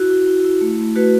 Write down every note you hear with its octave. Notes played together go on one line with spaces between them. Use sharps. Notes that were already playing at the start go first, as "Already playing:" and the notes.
Already playing: E4 F#4
E4
E4
E4
A3
A3
A3 F#4 B4